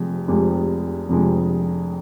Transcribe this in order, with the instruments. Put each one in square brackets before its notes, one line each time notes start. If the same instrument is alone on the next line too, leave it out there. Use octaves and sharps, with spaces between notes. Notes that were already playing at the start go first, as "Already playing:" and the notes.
Already playing: [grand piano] F1 F2 C3 G#3
F1 F2 C3 G#3
F1 F2 C3 G#3